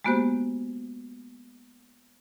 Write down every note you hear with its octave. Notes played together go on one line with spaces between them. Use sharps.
G#3 A#3 B3 F#4 G4 C5